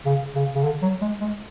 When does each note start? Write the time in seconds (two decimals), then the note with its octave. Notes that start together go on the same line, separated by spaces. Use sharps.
0.06 C#3
0.35 C#3
0.55 C#3
0.64 D3
0.82 F#3
1.01 G#3
1.21 G#3